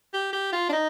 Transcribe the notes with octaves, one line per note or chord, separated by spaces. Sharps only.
G4
G4
F4
D4
D#4